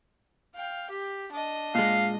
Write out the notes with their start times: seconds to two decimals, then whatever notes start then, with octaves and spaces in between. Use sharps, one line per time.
0.55 F5 G5
0.90 G4
1.32 D4 D#5
1.75 A#2 G#3 F5